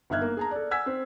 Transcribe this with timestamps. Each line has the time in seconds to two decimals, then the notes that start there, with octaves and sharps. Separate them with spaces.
0.10 G1 D#4 E5 F6 F#6 G#6
0.21 A#3
0.37 G#4 A5 A#5
0.51 A4 D5
0.71 F#5 G#5 E6 G#6 B6
0.86 C4